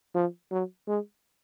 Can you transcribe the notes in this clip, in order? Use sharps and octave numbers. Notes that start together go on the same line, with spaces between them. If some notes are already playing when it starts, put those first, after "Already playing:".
F3
F#3
G#3